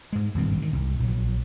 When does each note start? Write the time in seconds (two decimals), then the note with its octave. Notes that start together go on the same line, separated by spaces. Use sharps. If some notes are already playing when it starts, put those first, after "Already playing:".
0.13 G#2 G#3
0.35 D#1 G#1 G2 C4
0.58 D#3 E3
0.73 C2
1.00 A#1 F#3